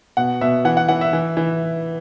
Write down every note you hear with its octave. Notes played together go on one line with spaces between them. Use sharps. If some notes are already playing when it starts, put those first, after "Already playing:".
B2 F#5
B2 E5
E3 F#5
F#5
E3 F#5
E5
E3
E3